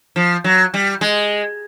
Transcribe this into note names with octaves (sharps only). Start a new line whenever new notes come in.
F3
F#3
G3
G#3